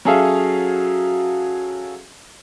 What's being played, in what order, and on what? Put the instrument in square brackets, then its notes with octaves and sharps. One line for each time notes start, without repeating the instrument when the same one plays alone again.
[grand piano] F#3 C#4 G#4 A4 E5 F5